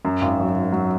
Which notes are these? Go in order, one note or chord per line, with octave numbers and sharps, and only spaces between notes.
F#2
G#1
F#3
G#1
F#3